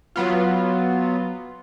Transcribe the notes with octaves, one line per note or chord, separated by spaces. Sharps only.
F#3 B3 F4